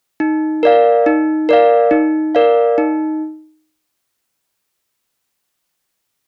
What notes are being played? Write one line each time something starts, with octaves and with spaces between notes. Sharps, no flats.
D#4
A#4 D5 F5
D#4
A#4 D5 F5
D#4
A#4 D5 F5
D#4